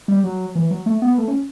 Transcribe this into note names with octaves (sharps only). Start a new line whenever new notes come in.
G3
F#3
E3
F#3
A3
B3
A3
C#4